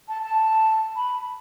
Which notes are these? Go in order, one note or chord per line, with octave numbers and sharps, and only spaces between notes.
A5
A5
B5